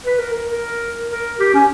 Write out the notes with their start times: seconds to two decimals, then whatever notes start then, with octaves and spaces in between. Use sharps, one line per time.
0.05 B4
0.19 A#4
0.33 A#4
0.49 A#4
1.10 A#4
1.39 G4
1.54 C#4